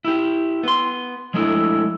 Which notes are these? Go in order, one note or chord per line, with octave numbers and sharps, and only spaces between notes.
E4 G4
B3 C6
F3 G#3 A3 D4 E4